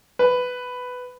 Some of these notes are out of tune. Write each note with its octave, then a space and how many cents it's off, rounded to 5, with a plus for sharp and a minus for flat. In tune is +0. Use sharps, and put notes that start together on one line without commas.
B4 +10